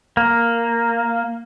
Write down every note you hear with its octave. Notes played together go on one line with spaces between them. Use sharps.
A#3